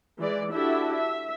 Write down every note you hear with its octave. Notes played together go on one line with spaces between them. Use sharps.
E3 G#3 D5
D4 E4 F#4 G4 A4 E5
E5